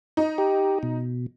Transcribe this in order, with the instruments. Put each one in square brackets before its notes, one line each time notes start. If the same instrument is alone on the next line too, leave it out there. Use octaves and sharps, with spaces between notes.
[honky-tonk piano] D#4
[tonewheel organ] G4
B2